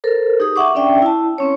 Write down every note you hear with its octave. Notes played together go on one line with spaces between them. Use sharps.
A4 A#4 C5
D#4 G4 G#4 D#6
E5 F#5 C#6 D6
C#4 D4 D5 E5 G5
E4 A5
C4 C#4 C#5